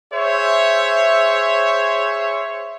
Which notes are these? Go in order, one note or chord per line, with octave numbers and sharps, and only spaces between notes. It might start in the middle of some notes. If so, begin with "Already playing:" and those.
G#4 C5 C#5 E5